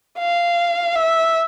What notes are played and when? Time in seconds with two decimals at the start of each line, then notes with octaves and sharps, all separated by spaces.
0.19 F5
0.96 E5